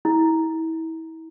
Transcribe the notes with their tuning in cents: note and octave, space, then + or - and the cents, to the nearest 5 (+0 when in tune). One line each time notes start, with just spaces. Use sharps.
E4 -30